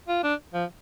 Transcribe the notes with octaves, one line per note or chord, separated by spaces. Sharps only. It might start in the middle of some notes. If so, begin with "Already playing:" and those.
F4
D4
F3